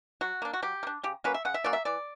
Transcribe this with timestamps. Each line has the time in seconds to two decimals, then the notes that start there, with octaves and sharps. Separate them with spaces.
0.21 F#3 F#4
0.42 A#3 D4
0.53 F#4
0.62 F#3 G4
0.83 A#3
0.87 D4
1.03 C#3 G4
1.24 F#3 A#3 C#4 B4
1.34 E5
1.45 C#3 F#5
1.54 E5
1.64 F#3 A#3 C#4 D5
1.73 E5
1.85 E3 D5